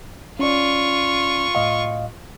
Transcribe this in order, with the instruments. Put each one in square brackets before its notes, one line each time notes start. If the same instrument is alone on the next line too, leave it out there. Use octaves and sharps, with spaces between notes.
[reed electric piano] C#4 D5 [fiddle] F4 C#6
[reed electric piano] A2 D#5 F5